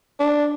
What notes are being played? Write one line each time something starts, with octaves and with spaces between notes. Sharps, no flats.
D4